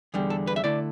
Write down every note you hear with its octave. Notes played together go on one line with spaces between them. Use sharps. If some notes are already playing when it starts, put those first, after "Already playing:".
E2 D3 G3
A4
B4
E5
D3 A3 E4 D5